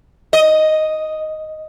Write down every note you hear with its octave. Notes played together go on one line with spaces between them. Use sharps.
D#5